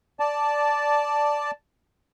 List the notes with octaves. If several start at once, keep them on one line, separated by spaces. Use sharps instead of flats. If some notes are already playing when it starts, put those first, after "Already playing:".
D5 A5